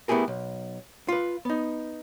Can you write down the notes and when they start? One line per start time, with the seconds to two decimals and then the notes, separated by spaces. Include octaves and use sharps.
0.08 A3 B3 E4 G4 G#4 A#4
0.28 B1
1.08 F4 B4
1.45 B3 D#4